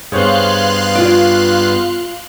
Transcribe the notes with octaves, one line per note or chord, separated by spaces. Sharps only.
G2 B3 G#4 C5 C#5 F5 C6 F#6
F4 D5